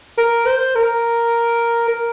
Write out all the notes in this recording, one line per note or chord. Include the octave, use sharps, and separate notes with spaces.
A#4
C5
A#4
A#4